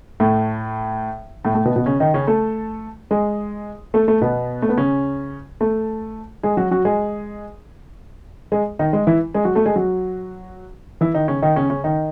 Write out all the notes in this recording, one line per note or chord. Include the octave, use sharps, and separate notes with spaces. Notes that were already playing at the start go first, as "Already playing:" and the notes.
A2 A3
A2 A3
A2 A3
B2 B3
B2 B3
C#3 C#4
D#3 D#4
C#3 C#4
A3 A4
G#3 G#4
A3 A4
A3 A4
B2 B3
A3
B3
C#3 C#4
A3 A4
G#3 G#4
F#3 F#4
F#3 F#4
G#3 G#4
G#3 G#4
D#3 D#4
G#3
E3 E4
G#3 G#4
F#3 F#4
A3 A4
G#3 G#4
F#3 F#4
E3 E4
D#3 D#4
C#3 C#4
D#3 D#4
C#3 C#4
C#3 C#4
D#3 D#4